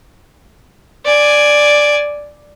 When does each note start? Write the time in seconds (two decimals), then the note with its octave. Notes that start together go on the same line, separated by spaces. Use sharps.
1.05 D5 G#5